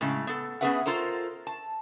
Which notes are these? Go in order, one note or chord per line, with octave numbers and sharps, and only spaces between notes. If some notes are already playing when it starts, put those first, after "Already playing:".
A2 C#3 G#3
B3 A4
B3 C#4 G#4 B4 E5 F#5
F4 A4 A#4 C5
A5